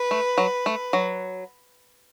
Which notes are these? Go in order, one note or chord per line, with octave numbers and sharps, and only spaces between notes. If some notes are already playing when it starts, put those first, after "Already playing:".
Already playing: B4
A3
F#3
A3
F#3